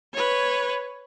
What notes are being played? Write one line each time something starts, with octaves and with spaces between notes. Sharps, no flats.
B4 C#5